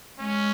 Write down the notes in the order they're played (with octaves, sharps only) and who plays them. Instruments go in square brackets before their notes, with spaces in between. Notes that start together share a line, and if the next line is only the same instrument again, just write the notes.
[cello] G#3 [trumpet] C#4